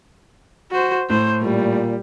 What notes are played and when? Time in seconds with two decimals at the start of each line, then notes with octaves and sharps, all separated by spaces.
0.71 F#4 C5
1.10 A2 C5
1.42 A#2 G3